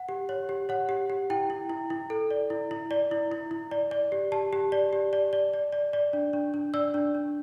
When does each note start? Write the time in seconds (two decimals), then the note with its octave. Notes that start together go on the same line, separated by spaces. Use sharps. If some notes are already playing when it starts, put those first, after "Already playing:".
Already playing: F#5
0.09 G4
0.29 C#5
0.49 G4
0.69 C#5 F#5
0.89 G4
1.10 G4
1.30 E4 G5
1.50 E4
1.70 E4
1.90 E4
2.10 A4
2.31 D5
2.50 E4
2.71 E4
2.91 D5
3.11 E4
3.32 E4
3.51 E4
3.71 D5
3.91 D5
4.12 G4
4.32 G4 A5
4.53 G4
4.72 D5
4.93 G4
5.13 D5
5.33 D5
5.54 D5
5.73 D5
5.93 D5
6.13 D4
6.33 D4
6.54 D4
6.74 D5 E6
6.94 D4
7.15 D4